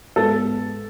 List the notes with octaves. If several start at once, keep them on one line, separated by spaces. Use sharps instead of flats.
G#2 G#3 B3 A4